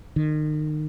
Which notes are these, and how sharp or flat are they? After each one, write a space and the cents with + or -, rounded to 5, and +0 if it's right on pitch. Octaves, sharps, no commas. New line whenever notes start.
D#3 -35